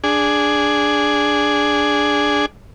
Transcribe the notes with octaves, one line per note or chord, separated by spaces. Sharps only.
D4 G#4